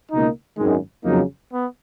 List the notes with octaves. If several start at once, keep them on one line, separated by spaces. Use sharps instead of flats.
C#2 B2 A#3 D#4
G#1 F#2 D#3 G#3
F2 C#3 F#3 A#3 D#4
B3